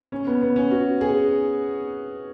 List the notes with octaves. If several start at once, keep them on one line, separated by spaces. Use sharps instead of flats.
C#4
B3
B3
C#4
F#4
G#4